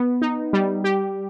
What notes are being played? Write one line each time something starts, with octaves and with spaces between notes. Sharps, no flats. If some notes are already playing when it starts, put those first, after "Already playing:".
Already playing: B3
D#4
G3
G4